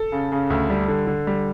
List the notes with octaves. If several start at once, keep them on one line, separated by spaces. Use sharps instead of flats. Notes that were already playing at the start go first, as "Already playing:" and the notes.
Already playing: A4
C#3
C#3
D2
G3
D3
D3
G3